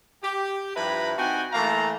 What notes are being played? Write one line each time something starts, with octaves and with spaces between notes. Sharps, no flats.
G4
G2 F3 E4 B4 A#5 B5
C4 D#4 F#4 G5 G#5
E3 A3 A#3 F5 A#5